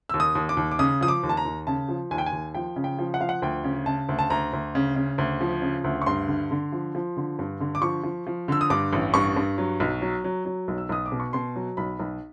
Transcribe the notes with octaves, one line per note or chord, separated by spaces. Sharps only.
D#2 E6
D#6
D#2
D6
D#2
D6
C#3 D#6
F3 D#6
D6
D#2
A5
A#5
D#2
C#3 A5
F3
D#2 G#5
G5
G#5
D#2
F3 G5
C#3
G5
F3
F#5
F3 F5
F#5
D2 G5
C#3
C#3 A5
D2
A5
D2 A#5
D2
C#3
C#3
D2
F3
C#3
D2
C#6
G2 C6
D3
D3
F3
F3
D3
G2
D3
D6
F3 C#6
F3
F3
D3 E6
D#6
G2 D6
A1
G2 C#6
G2
F#3
B1
F#3
F#3
F#3
B1
E6
B1 D#6
D6
B2
C#6
B2 C6
F#3
B1 B5
B1